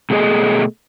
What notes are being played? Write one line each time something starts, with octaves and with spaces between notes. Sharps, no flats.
B2 A3 G#4 D#5